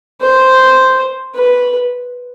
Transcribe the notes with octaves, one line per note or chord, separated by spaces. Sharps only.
C5
B4